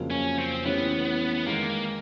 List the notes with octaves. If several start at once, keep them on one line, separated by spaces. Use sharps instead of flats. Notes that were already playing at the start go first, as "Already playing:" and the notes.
Already playing: F2 C#3 F#3 A#3
C#4
C4
E3 A3 B3 C#4 E4 G4
B3
D#3 G#3 A#3